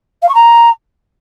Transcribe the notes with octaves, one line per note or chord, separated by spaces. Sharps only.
F5
C#6
A#5